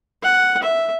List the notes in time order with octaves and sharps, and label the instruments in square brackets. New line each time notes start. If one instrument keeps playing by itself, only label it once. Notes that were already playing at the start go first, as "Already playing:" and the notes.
[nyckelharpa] F#5
E5